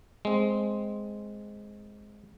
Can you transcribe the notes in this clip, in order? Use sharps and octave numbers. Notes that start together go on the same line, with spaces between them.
G#3 C4